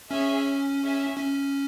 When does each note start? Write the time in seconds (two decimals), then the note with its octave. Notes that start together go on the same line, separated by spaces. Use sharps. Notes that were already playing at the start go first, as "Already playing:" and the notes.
0.11 C#4 G#4 C#5 E5
0.82 G#4 C#5 E5 G#5
1.17 C#4